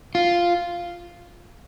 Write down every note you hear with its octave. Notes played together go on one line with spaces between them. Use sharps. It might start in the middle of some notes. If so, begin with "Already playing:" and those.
F4